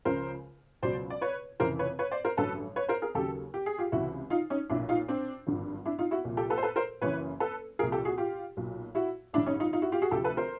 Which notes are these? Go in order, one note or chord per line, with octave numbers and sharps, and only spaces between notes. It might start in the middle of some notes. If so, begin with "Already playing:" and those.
C#2 C#3 F3 A#4 C5
C#2 B2 F#3 C5 D5
D5
B4 C#5
F1 F2 C#3 E3 A#4 C5
B4 C#5
B4 C#5
C5 D5
A#4 C5
A1 G2 D3 F#3 A4 B4
B4 C#5
A#4 C5
G#4 A#4
D#2 C#3 F#3 G4 A4
G4
G#4
F4 G4
C#2 C3 E3 E4 F#4
D#4 F4
C#4 D#4
B1 A#2 F3 D4 E4
D#4 F4
C4 D4
G#1 G2 D3 F3
D4 E4
D#4 F4
E4 F#4
C2 A#2 F3
G4 A4
A4 B4
C5
A4 B4
A#4 C5
F#1 F#2 C#3 E3 B4 C#5
A4 B4
C2 A#2 F3 G#4 A#4
G4 A4
F#4 G#4
F4 G4
B1 A#2 F#3
E4 F#4
A1 G2 D3 D4 E4
C#4 D#4
D#4 F4
D#4 F4
E4 F#4
F4 G4
F#4 G#4
D2 C3 F3 G4 A4
A4 B4
A#4 C5